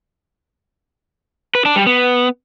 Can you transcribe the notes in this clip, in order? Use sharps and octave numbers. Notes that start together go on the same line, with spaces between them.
B4
D4
G3
B3